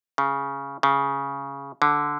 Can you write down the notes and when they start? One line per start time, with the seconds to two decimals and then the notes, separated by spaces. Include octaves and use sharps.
0.18 C#3
0.83 C#3
1.82 D3